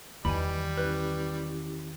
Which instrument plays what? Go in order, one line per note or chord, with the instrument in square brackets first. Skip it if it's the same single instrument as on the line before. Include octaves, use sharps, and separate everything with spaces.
[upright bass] E2 D#3 [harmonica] G3 [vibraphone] B4 D#5 G5 [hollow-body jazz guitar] G#5 B5
[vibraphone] C#4 E4 G4 [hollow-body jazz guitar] B4